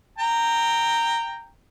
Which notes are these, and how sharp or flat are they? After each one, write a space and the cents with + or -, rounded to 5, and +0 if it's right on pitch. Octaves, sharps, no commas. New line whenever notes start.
G5 +5 A#5 -10